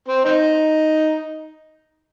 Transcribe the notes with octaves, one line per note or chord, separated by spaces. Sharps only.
C4
C4 D#4